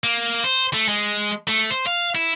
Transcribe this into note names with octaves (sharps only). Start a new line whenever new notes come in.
A#3
C5
A3
G#3
A3
C5
F5
E4